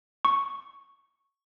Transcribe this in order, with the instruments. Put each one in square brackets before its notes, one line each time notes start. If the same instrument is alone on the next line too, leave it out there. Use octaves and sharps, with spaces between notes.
[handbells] C#6